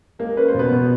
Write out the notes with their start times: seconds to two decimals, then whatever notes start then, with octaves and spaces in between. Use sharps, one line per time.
0.19 G#3 A#3 A#4
0.37 C#4 B4
0.48 C5
0.54 B2 B3 B4
0.71 B2